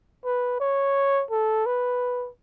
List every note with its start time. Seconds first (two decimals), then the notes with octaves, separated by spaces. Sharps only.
0.25 B4
0.60 C#5
1.31 A4
1.66 B4